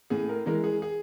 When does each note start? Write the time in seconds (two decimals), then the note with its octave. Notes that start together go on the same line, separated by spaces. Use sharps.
0.10 A2 G#4
0.29 A#4
0.46 E3 G#3 A#4
0.64 G#4
0.82 G#4